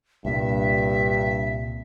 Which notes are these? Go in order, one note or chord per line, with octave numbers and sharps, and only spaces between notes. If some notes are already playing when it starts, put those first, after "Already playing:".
C2 G2 A#2 E5